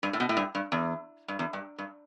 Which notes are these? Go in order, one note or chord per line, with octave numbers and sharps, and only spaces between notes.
G2
A2
B2
A2
G2
G2
E2
G2
E2
G2
G2